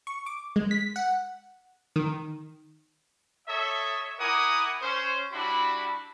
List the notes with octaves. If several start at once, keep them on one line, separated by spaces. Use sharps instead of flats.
C#6
D6
G#3
B6
F#5
D#3
A4 C#5 D#5 E5
E4 A#4 F#5 G#5 D6 D#6
C#4 C5
G3 D4 E4 F#4 B5